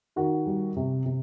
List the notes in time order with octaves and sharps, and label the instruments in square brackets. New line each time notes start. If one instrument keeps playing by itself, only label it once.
[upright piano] D#3 F#4
G3
C3
C3